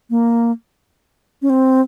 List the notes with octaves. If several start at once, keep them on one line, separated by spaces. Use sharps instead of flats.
A#3
C#4
C4